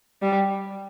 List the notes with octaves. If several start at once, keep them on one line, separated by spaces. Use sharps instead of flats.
G3